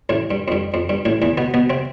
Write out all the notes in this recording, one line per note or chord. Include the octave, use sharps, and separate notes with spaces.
A1 A2
G2
F2
G2
F2
G2
A1 A2
E2 E3
B2 B3
B2 B3
C3 C4